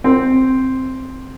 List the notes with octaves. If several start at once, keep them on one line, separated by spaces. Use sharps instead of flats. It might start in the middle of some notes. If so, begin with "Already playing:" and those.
C4